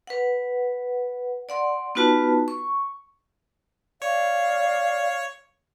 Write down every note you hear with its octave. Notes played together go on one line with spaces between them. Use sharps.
B4 F#5
D5 F#5 C6
B3 D#4 F4 F#4 B4 A5
C#6
C#5 D5 F5